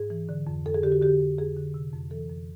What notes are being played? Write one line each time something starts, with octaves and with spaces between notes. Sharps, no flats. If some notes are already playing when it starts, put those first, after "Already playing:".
Already playing: G#2 G#4
E3
D3
F2
F2 A4
G#4
D3 G4
F#4
D3 G4
F2
F2 G#4
D3
C3
F2
E3 A4
F2